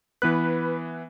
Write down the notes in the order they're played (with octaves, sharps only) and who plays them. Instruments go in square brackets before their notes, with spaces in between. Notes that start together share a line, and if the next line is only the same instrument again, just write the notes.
[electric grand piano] E3 B3 F#6 [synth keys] B4